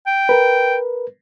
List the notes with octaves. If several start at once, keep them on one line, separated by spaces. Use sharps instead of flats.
G5
A#4 B4